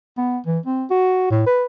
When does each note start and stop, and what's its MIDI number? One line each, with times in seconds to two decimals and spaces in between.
0.18 0.38 59
0.46 0.59 52
0.66 0.85 60
0.90 1.29 66
1.30 1.45 45
1.47 1.65 71